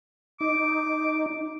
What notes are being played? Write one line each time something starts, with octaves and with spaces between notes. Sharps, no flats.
D#4 D6